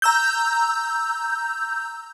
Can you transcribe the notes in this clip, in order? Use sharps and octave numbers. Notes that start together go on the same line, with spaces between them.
A#5 E6 G6